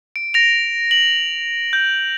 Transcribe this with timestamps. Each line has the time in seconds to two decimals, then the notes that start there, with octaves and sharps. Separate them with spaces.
0.16 D7
0.34 A#6 D7 F7
0.91 F#7
1.73 G6